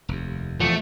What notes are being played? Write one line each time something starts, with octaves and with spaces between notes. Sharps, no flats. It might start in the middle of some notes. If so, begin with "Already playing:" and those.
F1 D#2
A#1 E2 F3 A3